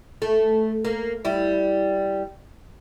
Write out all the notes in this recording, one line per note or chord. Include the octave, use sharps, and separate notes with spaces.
A3
A#3
G3 E4